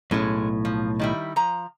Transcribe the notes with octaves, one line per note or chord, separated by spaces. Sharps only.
B1 A2 G#3 C#4
F3
D#3 G3 E4
F3 A#5